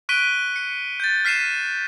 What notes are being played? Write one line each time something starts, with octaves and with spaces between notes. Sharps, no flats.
C#6 F#6 B6 D7 D#7 G7
C#7
G6 A6
F6 B6 C7 D#7 E7